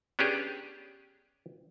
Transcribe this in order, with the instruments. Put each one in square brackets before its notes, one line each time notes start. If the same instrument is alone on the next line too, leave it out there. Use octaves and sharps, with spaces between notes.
[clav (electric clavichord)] B3 C#4 D4 G4 G#4